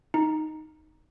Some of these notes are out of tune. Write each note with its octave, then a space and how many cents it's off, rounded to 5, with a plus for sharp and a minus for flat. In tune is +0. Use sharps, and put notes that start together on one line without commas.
D#4 +0